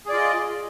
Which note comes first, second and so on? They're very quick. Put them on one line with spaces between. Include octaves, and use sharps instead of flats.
G#4 D5 F4 D#5